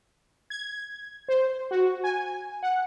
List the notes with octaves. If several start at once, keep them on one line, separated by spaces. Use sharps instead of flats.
G#6
C5
F#4
G#5
F#5